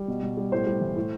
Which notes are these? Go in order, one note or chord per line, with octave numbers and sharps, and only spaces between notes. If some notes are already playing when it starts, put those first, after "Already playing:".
Already playing: G3
B2
B2
G3
A2 C5
G3
E3
A2